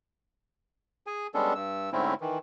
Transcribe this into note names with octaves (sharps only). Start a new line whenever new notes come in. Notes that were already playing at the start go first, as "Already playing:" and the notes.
G#4 G#5
G3 G#3 B3 C#4 D4 A4
G2 E6
G#2 D3 A3 C4 C#4 E4
D#3 E3